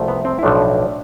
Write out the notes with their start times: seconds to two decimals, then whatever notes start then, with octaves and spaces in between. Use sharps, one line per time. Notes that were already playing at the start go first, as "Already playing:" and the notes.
Already playing: C2 C3 F3 A3
0.08 B3
0.25 C4
0.39 E4
0.43 B1 A2 F3 A3 D4